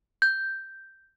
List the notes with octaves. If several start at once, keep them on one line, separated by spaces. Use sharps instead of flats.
G6